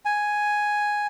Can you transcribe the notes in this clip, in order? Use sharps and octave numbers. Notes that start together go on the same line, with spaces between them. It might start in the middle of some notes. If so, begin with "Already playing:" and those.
G#5